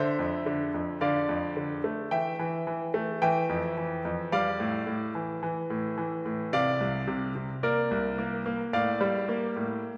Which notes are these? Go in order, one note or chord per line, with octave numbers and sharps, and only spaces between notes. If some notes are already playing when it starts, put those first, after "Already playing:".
Already playing: D3 C5 E5
F2
D3
F2
D3 D5 F5
F2
D3
A3
E3 E5 G5
E3
E3
A3
E3 E5 G5
F2
E3
F2
G3 D5 F5
A2
A2
E3
E3
A2
E3
A2
C3 D5 F5
C2
C3
C3
A#3 A#4 D5
C2
A#3
A#3
A2 D5 F5
G3
A#3
A2